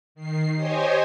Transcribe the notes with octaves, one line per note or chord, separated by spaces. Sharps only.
D#3 C7
G4 C5 C#5 D#5 G#5